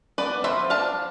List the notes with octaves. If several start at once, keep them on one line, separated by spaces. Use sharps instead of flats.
B3 B4 D5
F3 C5 E5
D4 F5 A5